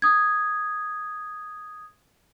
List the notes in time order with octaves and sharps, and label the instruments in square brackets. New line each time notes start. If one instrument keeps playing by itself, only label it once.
[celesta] D#6 G#6